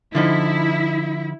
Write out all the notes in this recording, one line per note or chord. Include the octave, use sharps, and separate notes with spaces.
D3 F3 D#4 E4